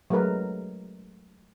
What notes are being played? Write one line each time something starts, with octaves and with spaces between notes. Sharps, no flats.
F#3 G#3 A3 A#4 B4